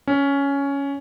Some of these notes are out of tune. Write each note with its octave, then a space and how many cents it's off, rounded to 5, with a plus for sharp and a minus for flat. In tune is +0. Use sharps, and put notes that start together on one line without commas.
C#4 +10